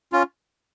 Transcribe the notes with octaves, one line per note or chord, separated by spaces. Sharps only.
C#4 F4